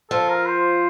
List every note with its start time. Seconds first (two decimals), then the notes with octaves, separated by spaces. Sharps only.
0.10 F3 F4 A4
0.29 A#4
0.46 C5